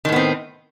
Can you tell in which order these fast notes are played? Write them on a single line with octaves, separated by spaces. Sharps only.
D#3 A2 B3 C4